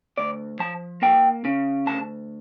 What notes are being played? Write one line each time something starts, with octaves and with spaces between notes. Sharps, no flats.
D2 D5
F3 A5
A#3 G5
C#3
D2 A5